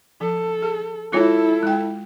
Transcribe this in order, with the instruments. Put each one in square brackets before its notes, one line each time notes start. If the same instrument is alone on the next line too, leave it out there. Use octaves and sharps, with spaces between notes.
[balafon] F3 [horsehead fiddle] A4
[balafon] G#4
[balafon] G#3 F4 C#5 [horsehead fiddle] E4 A4
[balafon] G#3 G5